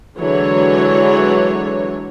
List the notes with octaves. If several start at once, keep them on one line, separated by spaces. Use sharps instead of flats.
D3 E3 F#3 G#3 C#5